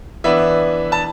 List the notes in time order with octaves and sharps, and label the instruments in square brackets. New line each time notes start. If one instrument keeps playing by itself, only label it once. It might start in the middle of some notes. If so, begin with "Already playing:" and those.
[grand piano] E3 B3 D4 B4 E5
A5